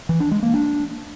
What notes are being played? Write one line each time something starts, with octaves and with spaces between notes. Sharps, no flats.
E3
D4
G#3
A#3
D4